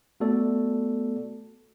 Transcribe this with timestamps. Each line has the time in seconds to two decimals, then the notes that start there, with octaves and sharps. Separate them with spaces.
0.20 A3 B3 F#4 A4 D5